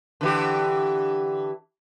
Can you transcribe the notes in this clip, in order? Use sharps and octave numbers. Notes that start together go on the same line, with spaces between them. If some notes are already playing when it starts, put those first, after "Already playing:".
D3 E3 G4